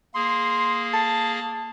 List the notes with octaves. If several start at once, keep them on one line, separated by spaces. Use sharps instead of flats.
A#3 G#4 C6
A5